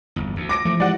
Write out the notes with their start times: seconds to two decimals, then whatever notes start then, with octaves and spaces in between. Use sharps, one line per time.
0.16 G1 E2
0.36 D2
0.49 D6 A#6 D7
0.65 E3 F3 A3
0.80 G#3 E4 G4 D5 F#5